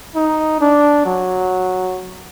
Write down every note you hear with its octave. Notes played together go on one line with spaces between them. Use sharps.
D#4
D4
F#3